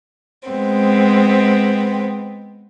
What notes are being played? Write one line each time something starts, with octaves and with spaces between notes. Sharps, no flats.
G#3 B3 C4